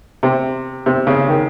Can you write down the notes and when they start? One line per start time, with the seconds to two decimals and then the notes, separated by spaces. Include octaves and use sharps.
0.23 C3
0.86 C3
1.07 C#3
1.28 D#3